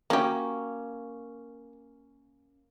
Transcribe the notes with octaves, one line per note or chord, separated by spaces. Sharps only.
F#3 A#3 C#4 G4